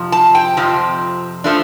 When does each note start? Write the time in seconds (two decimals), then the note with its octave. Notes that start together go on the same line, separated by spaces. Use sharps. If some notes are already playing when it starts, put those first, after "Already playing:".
Already playing: F2 C3 F3
0.12 A5
0.35 G5
0.57 F2 C3 F3
1.44 F3 A3 D4